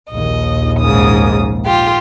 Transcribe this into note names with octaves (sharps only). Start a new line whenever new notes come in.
A#1 D#2 D#5
G#2 C#3 D#6
F4 G4